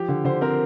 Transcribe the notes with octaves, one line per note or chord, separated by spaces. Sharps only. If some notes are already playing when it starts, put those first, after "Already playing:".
Already playing: F3 G4
D3
D3 C5
C4 A#4